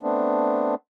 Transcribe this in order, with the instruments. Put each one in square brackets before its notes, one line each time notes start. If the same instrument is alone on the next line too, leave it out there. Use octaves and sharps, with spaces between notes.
[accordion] A3 B3 C4 D4